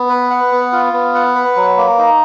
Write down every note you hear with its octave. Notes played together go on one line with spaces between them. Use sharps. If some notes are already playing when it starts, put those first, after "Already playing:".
Already playing: B3
B4
F#5
B3
F4
B3
F#5
B4
F#3
A#3
D#4